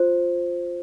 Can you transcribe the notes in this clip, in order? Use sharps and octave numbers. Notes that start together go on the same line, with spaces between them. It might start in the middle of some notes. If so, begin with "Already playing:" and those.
Already playing: F4 C5